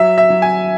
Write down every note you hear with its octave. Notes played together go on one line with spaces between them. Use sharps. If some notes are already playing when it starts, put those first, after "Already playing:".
Already playing: F#3 E5
E5
F#3
G#5